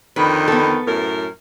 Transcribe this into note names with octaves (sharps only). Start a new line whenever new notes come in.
F2 D3 D#3 B4
B3 A4
F#2 A2 A#4